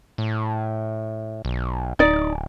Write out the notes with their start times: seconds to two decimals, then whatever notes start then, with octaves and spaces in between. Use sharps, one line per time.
0.18 A2
1.45 B1
1.99 D1 D#4 D5